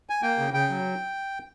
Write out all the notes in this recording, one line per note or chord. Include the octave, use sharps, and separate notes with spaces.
G#5
A#3 G5
C#3
C#3 G5
F#3